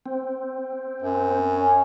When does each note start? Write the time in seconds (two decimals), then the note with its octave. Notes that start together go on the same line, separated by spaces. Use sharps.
0.06 C4
1.02 F#2
1.51 C#4